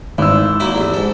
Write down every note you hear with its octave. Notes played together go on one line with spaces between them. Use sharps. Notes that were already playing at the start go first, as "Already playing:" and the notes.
G#1 E3 E6
F#3 A#3 E4
A1 E2
G#2 A4